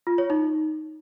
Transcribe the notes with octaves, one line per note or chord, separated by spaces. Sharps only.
F4
C#5
D#4